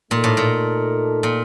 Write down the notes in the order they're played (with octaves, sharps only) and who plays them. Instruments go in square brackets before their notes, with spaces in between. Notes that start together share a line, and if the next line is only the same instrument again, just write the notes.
[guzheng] A#2 [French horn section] A3 D#4 A4
[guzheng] A2
A#2
A#2